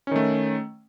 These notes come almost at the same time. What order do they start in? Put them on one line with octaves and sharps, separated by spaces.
C#4 D#3 A3